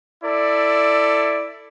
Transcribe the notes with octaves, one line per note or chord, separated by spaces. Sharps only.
E4 A4 D5